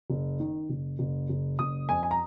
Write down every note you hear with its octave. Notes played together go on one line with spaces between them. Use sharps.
F#1
D#3
F#1
F#1
F#1
F#1 D#6
F2 G#5
G#5
A#5